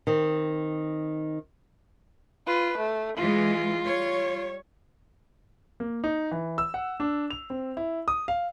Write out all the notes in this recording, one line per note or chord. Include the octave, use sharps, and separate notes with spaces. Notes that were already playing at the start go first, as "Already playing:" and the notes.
D#3 C4
F4 B4
A3
E3 G#3 F4
G3 C#5
A#3
D#4
E3
E6
F#5
D4
F7
C4
E4
D#6
F5